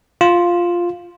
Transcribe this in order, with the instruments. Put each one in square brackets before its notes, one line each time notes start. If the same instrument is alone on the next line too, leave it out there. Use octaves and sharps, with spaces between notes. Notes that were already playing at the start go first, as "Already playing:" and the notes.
[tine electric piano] F4